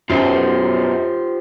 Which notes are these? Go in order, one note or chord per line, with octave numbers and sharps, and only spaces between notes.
B1 F#2 F4 G4 C5